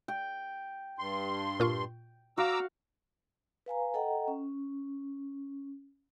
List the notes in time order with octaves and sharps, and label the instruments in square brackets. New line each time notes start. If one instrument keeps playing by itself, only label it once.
[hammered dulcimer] G5
[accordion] G2 C6
[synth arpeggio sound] A#2 F4 C#6
[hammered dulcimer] F#4 F5 [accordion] A#5 D6 E6
[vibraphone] B4 F5 G#5 A#5
A4 D#5 F#5 G5 A#5
C#4